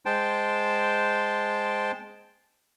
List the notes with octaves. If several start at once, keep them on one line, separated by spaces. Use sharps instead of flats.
G#3 C5 G5 A5